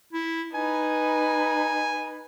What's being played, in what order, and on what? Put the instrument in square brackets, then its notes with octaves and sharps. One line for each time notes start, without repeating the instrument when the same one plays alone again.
[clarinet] E4
[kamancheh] D#4 B4 [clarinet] G#5